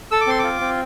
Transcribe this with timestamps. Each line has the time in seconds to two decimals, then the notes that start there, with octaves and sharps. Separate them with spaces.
0.11 A4 E6
0.21 D6
0.27 C4 C6
0.39 F4 D6
0.61 C4